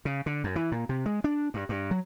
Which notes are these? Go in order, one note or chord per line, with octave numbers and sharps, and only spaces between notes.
C#3
D3
F#2
E3
A#2
C3
G#3
D4
G2
G2
F#3